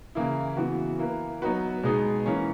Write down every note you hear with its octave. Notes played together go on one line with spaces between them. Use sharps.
C#3 E3 A#3 E4
C#3 E3 B3 F#4
A#3 E4 B4
F#3 B3 D#4 F#4 B4
B2 G#3 B3 D#4 G#4
E3 A#3 C#4